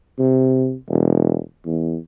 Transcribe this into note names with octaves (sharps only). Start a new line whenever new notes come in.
C3
E1
E2